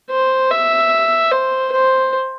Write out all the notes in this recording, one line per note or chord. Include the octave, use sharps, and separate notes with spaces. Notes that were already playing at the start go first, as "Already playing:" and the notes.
C5
E5
C5
C5